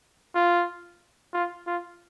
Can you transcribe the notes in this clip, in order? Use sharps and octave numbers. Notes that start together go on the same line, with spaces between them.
F4
F4
F4